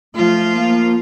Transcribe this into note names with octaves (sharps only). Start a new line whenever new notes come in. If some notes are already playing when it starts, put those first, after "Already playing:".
F3 A3 F4
A#3